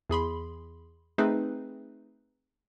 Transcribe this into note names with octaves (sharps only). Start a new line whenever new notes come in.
E2 G#4 B5 C6
A3 C4 D#4 G#4 B4